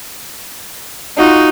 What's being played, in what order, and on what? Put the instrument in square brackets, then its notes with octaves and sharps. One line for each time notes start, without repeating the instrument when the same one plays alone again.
[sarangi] D#4 [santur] F4 F#4 B5